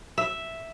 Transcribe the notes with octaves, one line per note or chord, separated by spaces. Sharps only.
E5